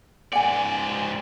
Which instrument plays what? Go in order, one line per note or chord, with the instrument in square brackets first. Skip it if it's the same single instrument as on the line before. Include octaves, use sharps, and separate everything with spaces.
[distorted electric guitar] G#2 D5 [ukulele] F#5 G#5